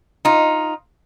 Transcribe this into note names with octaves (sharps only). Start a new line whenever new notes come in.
D#4 F4